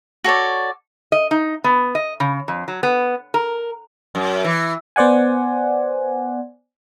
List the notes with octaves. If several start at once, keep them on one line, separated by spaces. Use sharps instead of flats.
F#4 A4 C#5 D5
D#5
D#4
B3
D#5
C#3
F2
F#3
B3
A#4
F#2
E3
B3 C5 D5 F#5 G#5